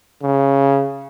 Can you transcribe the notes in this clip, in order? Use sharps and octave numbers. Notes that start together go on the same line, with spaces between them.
C#3